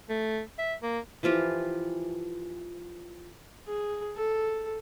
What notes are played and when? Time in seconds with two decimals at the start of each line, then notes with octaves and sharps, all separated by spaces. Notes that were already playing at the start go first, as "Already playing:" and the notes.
0.09 A3
0.59 E5
0.83 A#3
1.23 E3 F3 F4 G4
3.67 G#4
4.16 A4